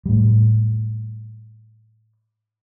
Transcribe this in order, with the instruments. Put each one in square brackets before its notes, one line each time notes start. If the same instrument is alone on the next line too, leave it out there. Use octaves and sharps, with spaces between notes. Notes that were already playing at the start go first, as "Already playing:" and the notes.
[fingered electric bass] A2 G3